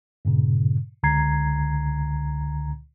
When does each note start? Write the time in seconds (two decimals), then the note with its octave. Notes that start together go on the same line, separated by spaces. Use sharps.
0.25 G2 A#2 C#3
1.03 C#2 D3 A#5 G#6 C7